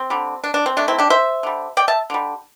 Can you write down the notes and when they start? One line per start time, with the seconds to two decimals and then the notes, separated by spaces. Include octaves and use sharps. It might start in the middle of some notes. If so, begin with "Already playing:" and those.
Already playing: C4
0.10 D3 G3
0.44 D4
0.54 D4
0.66 C4
0.77 C3 A3 D4
0.88 C4 E4
0.98 D4 G4
1.10 C5 E5
1.43 D3 G3
1.77 D5 G5
1.88 E5 A5
2.10 D3 G3